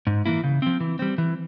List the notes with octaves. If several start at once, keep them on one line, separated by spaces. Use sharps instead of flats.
G#2
E3 A#3 E4
C#3
F3 C4
E3
G3 C4
E3